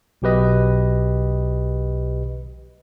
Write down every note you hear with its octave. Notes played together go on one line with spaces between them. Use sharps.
B1 B2 G4 B4 D#5